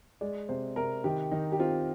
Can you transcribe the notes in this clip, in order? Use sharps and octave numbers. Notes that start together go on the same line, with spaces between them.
G#3 D5
C3 C5
C3 A#4
D#3 G4
D#3 D#4
G4
C4 F4